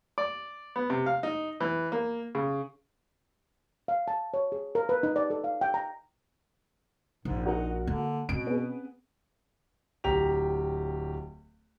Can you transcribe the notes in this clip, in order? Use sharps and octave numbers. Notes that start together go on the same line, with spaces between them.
D5
B3
C3
F5
D#4
E3
A#3
C#3
F5
A5
C#5
G#4
A#4
B4
D#4
D5
A4
F5
G5
A#5
A#1 G#2
D#4 F#4 A#4 F#5
D3 A#3
B2 C4 C#4 D7
B3 G#4
D1 G4 A#5 F7